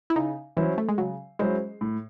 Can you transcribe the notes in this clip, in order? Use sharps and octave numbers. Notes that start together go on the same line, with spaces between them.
E4
C#3 D#4
E3 F#3 C#4 E4 C5
A3
G#3
C#3 F#3
F#3 G#3 C#4 E4 C5
A2